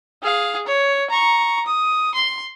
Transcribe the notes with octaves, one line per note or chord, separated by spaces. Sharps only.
G#4 F5
C#5
A#5 C#6
D#6
C6